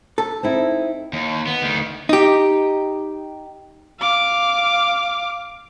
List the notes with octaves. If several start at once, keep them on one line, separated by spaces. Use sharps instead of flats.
A4
C4 D#4 E4
D#2
B3
D2 D#3
D#4 G4
F5 D6